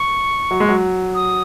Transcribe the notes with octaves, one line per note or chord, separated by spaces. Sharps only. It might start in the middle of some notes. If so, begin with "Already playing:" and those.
Already playing: C#6
F#3
G#3
F#3
D#6